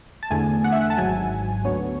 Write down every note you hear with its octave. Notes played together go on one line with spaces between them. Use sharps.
A5
E2 D3 A3 G#5
F#5
E5
F#5
A5
G#1 G#2 F#3 G#5
D2 D3 F#3 B3 C#5